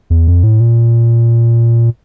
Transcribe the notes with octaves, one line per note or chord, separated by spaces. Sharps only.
E2
F2
A2
A#2